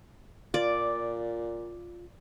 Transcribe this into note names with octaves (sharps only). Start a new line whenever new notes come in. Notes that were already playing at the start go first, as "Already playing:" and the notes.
A#2 F4 D5